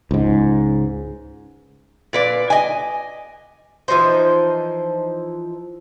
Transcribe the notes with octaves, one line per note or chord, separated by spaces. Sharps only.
C#2 G#2
A#2 B4 D5
D#5 G#5
E3 F3 D#4 C5